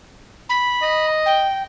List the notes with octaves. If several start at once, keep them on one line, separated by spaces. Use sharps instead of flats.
B5
D#5
G5